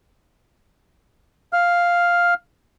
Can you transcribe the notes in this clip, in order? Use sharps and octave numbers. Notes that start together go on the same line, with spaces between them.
F5 F6